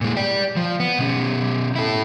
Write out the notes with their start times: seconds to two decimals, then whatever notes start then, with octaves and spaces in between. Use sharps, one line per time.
0.01 A#2 G#3
0.17 D5 G5
0.56 F3
0.80 B3
0.99 B2 C#4
1.76 E4 A4